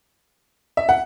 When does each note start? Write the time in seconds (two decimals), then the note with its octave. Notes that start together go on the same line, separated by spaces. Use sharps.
0.77 E5
0.89 F#5